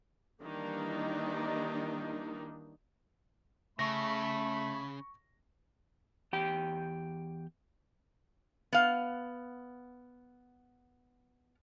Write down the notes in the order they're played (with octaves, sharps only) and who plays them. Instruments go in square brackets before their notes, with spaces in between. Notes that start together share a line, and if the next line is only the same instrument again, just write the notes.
[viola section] D#3 E3 G3 A#3 D4 D#4
[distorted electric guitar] C#3 [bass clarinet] A3 [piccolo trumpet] B5 [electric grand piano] C#6 A#6
[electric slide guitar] E2 G4 G5
[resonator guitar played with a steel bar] B3 F5